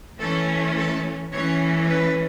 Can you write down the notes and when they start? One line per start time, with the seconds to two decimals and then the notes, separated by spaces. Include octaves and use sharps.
0.20 E3 A3 C#4 A4
0.76 A4
1.33 E3 A3 C#4 C#5
1.89 B4